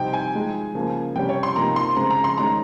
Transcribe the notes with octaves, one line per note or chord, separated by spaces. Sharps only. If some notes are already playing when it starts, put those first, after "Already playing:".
Already playing: C3 G3 C4 D#4 G5
G#5
F3 G#3 D#4
C#3 F3 A#3
C3 G3 C#4 G5
C#5
C6
C3 F3 A#3 D#4 A#5
C6
C#3 G#3 C4 A#5
A#5
C6
D#3 G#3 C#4 A#5